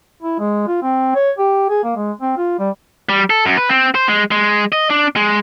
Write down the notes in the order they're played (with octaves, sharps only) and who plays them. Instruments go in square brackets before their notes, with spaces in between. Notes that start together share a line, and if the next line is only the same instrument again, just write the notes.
[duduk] E4
G#3
F4
C4
C#5
G4
G#4
A#3
G#3
C4
F4
G3
[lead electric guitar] G3
A4
F#2
B4
C4
C5
G#3
G#3
D#5
D4
G#3